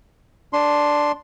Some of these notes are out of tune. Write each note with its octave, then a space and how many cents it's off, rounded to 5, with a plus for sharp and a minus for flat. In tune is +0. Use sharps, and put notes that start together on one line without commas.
D4 +0 C6 +0